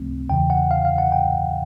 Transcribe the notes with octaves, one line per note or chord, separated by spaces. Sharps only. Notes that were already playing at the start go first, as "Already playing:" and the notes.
Already playing: C#2 C3 F3 A3 C4
E2 C#3 E3 G5
F#5
F5
F5
F#5
G5